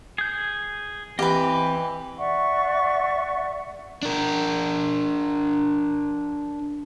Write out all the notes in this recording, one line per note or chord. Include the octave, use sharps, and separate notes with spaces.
G#4 G6
E3 C4 G4 B4 D#5
D5 E5 F#5 C#6
D4 A#4